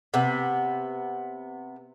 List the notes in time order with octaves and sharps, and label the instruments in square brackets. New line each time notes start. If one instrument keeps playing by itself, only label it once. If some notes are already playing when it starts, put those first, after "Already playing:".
[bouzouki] C3 B3